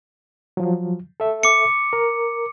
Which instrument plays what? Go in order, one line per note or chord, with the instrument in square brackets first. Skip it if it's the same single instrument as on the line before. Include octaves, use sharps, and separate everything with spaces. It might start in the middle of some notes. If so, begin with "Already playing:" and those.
[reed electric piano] F3 F#3
A4 E5
[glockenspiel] D6 C#7
[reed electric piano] A#4